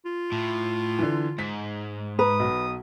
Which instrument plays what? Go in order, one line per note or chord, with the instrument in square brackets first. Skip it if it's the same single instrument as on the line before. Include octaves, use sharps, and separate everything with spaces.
[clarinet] F4
[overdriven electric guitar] A2
[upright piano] D3 E3
[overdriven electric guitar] G#2 [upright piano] B6
[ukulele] B4 [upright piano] A#5 [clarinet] D#6
[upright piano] B1